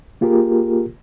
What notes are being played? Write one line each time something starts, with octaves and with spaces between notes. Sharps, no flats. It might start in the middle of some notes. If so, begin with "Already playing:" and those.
A#3 F4 G4 G#4 A#4